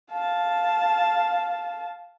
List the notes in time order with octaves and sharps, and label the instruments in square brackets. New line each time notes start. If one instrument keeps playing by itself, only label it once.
[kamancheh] F5 A5